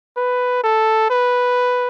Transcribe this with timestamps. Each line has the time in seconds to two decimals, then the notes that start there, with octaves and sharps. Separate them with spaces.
0.17 B4
0.64 A4
1.10 B4